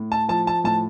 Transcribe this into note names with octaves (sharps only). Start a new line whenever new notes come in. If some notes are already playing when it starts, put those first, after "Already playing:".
Already playing: A2
A5
F3 A5
A5
A2 A5